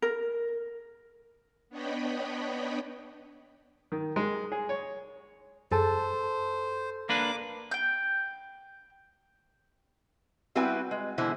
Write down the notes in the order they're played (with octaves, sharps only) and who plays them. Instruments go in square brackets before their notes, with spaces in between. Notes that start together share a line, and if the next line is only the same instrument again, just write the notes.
[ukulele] A#4
[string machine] B3 D4 C#5 D#5 G5 B5
[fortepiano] D#3
G#3
G#4
C#5
[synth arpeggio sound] F#2 G#4 A5 [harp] A4 [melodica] C5
[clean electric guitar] A#3 D4 B4 [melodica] D6
[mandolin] G5 G6
[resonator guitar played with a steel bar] G3 C4 E4 F#4 B4 G#5
G#3
B2 D3 E3 G#3 E4 C5